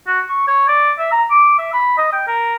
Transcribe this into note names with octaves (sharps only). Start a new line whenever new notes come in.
F#4
C#6
C#5
D5
E5
A#5
D6
E5
B5
D#5
G5
A#4